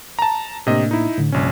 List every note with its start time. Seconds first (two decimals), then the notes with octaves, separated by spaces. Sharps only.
0.19 A5 A#5
0.67 A2 C3 A#3 D4 D#5
0.91 D#4 E4
1.18 A2 D3
1.32 A#1 G2 C3 C#4